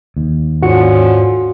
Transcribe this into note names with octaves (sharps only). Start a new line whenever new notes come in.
D#2
G#2 D3 F3 C#4 F4 F#4 C#7